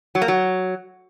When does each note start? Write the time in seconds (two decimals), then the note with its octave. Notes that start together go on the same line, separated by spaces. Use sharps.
0.15 F#3
0.22 A#3
0.28 F#3